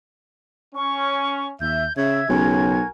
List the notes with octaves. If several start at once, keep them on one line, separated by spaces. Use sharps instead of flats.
C#4 C#6
D#2 E5 G6
C#3 E5 G#6
B1 C#3 F#4 A#4 G#5